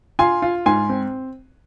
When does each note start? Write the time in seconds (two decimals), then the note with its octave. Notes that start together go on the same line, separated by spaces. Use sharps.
0.19 F4 G#5 C6
0.42 F4
0.66 G#2 G#5 C6
0.89 C4